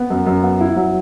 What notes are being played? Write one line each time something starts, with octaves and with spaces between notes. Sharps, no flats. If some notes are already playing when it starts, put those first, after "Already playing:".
Already playing: B3
F#2
F#2
B3
E4
F#3